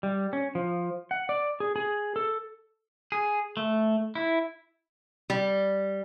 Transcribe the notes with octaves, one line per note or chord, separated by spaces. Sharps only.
G3
C#4
F3
F#5
D5
G#4
G#4
A4
G#4
A3
E4
G3